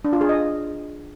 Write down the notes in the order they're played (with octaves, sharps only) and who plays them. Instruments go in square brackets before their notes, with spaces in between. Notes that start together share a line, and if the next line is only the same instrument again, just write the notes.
[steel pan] D4
F4
G#4
D#5